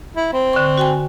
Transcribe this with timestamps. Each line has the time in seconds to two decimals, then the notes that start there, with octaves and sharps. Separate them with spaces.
0.16 E4
0.33 C4
0.53 D3 C#6
0.78 F#4 G5 G#5